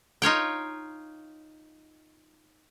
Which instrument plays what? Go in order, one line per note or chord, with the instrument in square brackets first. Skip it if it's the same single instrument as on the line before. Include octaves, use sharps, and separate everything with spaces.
[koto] D#4 F4 C#5 G5